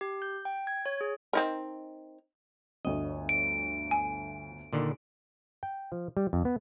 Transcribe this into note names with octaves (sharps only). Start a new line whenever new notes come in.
G4
G6
G5
G#6
C#5
G#4
C4 D#4 A#4
G1 D2 D#5
D7
G#5
A#2 D3 D#3
G5
F3
G3
F2
B3